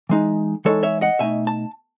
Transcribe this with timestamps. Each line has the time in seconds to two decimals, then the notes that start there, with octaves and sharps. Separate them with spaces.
0.09 E3 G#3 D#4
0.65 E3 G#3 D#4 A4 C#5
0.83 C#5 E5
1.01 D#5 F#5
1.19 B2 A3 D#4 E5 G#5
1.47 A5